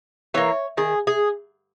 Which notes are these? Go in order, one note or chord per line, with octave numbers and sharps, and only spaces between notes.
E3 A#3 C#5
D#3 G#4
G#4